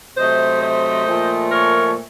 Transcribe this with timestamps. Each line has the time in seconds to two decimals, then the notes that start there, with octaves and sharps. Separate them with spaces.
0.17 C3 F#3 A3 C5 D#5
0.61 C5 D#5
1.06 A#2 F3 A3
1.50 A#4 C#5